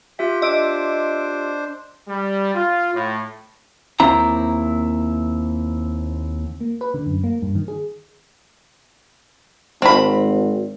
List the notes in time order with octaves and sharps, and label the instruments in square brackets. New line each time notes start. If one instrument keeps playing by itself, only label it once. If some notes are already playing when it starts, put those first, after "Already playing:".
[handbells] F4 G4 E5 [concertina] G5
[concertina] D4 C5 [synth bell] D#5 E6 D7
[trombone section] G3
F4
A2
[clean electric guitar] D#2 A#3 C4 E4 A#5
[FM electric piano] A#3
B4
D3
F#2
A#3
G2
D#3
G#4
[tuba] G#1 [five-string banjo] C4 B5